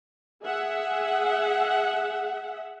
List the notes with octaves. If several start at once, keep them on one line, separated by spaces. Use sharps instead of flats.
G#4 E5 F#5